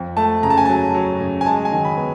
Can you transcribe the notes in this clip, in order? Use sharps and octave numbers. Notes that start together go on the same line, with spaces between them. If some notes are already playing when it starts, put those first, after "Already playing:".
Already playing: F2
A3 A5
C#3 A#5
A5
G#5
F#3 A5
F#3
C#3
G#5
G#3 A5
G#5
D#3
B5
B3